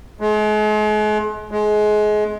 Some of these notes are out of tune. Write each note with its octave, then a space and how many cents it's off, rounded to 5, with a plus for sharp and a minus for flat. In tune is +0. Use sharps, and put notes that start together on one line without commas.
G#3 +40
G#3 +25